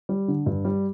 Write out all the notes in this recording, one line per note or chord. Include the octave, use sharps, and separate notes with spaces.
G3
D3
G2
G3